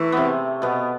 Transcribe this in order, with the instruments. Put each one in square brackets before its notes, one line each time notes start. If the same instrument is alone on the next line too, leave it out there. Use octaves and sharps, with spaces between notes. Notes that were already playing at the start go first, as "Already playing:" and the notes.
Already playing: [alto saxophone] E3 [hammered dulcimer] A3
[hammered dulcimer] C3 B3 C4
B2 B3